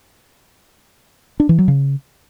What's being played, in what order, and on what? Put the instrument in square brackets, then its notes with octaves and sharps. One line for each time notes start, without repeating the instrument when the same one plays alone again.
[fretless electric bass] D4
E3
F#3
C#3